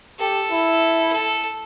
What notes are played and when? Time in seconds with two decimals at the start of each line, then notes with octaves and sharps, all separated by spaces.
0.20 G4 A4
0.51 E4
1.13 A4